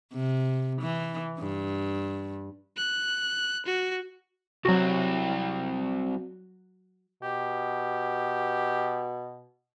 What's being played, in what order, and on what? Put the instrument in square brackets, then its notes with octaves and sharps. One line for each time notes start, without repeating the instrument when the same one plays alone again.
[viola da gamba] C3
E3
G2
[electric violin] F#6
F#4
[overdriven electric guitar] C2 C4 [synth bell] F#3 F#4
[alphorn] B2 [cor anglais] G4